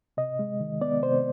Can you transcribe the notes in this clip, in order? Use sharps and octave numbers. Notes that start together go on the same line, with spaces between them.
C3 D#5
G#3
D#3
B3 D5
C3 C5